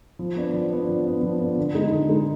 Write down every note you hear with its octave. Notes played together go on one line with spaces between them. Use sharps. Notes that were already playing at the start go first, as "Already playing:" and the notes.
F3
B3 D4
F3
B3 D4
F3
B3 D4
F3
B3 D4
D3
G#3 D#4
D3
G#3 D#4